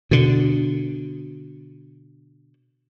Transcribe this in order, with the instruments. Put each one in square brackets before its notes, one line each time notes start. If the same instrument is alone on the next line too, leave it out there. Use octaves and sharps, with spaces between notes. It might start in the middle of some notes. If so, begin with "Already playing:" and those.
[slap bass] B2 D3